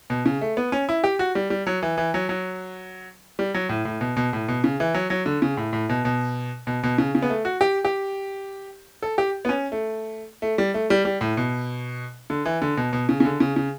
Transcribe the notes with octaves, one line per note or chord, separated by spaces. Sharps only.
B2
C#3
A3
B3
C#4
E4
G4
F#4
G3
G3
F#3
E3
E3
F#3
F#3
G3
F#3
A2
A2
B2
B2
A2
B2
C#3
E3
F#3
F#3
D3
C#3
A2
A2
B2
B2
B2
B2
C#3
C#3
B3
A3
F#4
G4
G4
A4
G4
B3
C#4
A3
A3
G3
A3
G3
G3
A2
B2
D3
E3
D3
B2
B2
C#3
C#3
D3
C#3
C#3